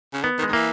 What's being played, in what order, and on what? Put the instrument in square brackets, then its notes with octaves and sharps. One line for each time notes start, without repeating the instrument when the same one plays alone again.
[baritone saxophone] C#3
[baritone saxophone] D#3 [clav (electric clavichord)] B3
[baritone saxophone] D#3
[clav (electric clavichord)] G#3
[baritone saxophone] D#3
[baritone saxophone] E3 [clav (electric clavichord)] A#3